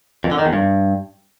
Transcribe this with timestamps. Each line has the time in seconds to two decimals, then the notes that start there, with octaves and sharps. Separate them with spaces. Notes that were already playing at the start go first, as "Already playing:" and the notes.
0.24 F2
0.31 D3
0.39 D#3
0.46 E2
0.53 G2